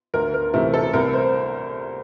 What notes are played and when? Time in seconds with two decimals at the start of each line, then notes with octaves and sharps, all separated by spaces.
0.14 D2 A#4
0.34 A#4
0.54 C3 E3 A3 A#4
0.74 A4
0.93 C2 A#4
1.13 C5